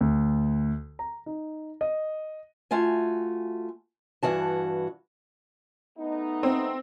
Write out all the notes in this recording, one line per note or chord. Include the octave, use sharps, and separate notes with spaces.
D2
A#5
D#4
D#5
A3 F4 F#4 G#5
G2 E3 F#4 A5
A3 B3 D#4
C4